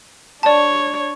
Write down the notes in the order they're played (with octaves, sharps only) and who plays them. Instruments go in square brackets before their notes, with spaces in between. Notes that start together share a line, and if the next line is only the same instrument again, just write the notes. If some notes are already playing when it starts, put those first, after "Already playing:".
[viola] D4 C#5 [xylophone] D5 A5